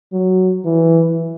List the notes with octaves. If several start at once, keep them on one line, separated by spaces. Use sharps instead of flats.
F#3
E3